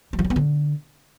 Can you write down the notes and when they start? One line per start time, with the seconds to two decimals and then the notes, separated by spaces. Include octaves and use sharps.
0.13 G3
0.19 F3
0.25 G3
0.30 B3
0.36 D3